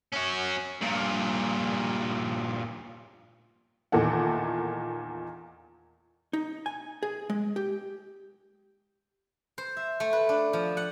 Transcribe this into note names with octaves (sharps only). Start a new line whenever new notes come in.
C#4 F#4
G2 A#2
E2 A#2 D#3 E3 A4 F#5
D#4
G#5
G#4
G#3
G4
C5
E5
A3
B4
D4
F3
F#5